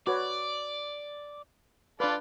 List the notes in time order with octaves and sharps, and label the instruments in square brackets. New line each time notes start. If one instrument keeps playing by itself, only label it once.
[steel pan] F#4 B4 C#5 [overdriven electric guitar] D5
[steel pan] D4 B4 [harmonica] F4 A4 D5